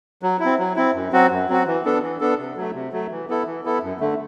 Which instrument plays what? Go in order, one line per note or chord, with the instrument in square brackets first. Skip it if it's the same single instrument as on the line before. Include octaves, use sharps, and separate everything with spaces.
[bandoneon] F#3
E4
C4
F#3
C4 E4
F#2
F#3 C4 F#4
F#2
F#3 C4 F#4
E3
B3 D4 A4
E3
B3 D4 A4
C3
F#3 A3
C3
F#3 A3
E3
B3 E4 A4
E3
B3 E4 A4
F#2
D3 A3